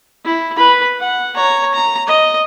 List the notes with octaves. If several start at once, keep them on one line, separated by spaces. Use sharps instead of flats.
E4
B4 B5
F#5
C#5 A#5
A#5
D#5